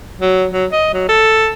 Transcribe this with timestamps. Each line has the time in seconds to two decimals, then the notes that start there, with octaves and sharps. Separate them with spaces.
0.20 F#3
0.52 F#3
0.72 D#5
0.94 F#3
1.09 A4